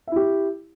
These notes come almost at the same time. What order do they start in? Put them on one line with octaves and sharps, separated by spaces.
E5 E4 G4